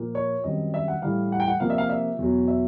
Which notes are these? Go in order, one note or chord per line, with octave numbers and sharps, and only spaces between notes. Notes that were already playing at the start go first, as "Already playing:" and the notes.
Already playing: A#2 F3 A#3
C#5
F#2 D#3 G3 C4 D#5
E5
F#5
A2 E3 G3 F5
F#5
G5
F#5
C3 F3 A#3 F5
E5
F5
E5
E2 B2 F#3
E5